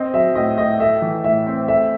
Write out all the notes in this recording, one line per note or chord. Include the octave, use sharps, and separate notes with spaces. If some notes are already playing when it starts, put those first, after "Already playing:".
Already playing: C4 D#5
F#3 E5
A2 D#5
A2 D#5
A3 E5
E3
A2 E5
C4
A3 E5